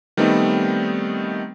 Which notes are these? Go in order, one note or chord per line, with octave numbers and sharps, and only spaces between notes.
D#3 G3 A3 B3 C4 D#4